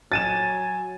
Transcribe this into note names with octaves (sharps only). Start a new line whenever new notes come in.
F#3 G#5 A6 D#7 E7